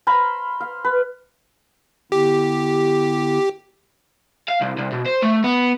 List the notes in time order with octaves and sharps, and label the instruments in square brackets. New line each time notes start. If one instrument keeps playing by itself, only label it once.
[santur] C5 F5 A#5 B5
F5
B4
[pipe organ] D3 B3 E4 [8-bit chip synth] G4
[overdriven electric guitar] F5
C2
C2
B2
C5
A3
B3